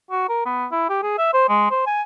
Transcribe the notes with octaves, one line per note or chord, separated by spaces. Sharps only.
F#4
A#4
B3
E4
G4
G#4
E5
C5
G#3
C5
G#5